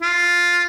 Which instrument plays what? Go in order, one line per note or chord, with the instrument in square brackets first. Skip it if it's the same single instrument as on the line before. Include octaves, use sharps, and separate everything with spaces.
[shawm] F4